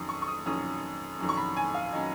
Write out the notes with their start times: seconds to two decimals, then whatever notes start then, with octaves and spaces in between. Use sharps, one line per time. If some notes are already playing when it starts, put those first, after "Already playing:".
Already playing: F2 D#3 F#3 C#4 D#6
0.09 C#6
0.22 C#6
0.28 D#6
0.46 F2 D#3 F#3 C#4 D#6
1.19 F2 D#3 F#3 C#4
1.29 C#6
1.37 B5
1.57 G#5
1.74 F5
1.93 D#3 F#3 C#4 D#5